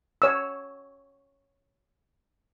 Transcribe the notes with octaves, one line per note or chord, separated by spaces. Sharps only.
C#5 E6